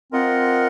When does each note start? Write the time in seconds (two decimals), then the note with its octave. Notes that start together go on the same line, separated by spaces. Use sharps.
0.12 C4 F4 A#4 D#5 F#5